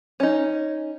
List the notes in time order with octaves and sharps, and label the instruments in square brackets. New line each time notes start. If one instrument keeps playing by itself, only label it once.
[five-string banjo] C#4 D#4